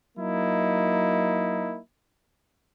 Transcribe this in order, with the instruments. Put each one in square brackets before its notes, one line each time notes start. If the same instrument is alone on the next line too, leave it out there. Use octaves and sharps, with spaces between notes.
[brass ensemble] F#3 A#3 D#4 E4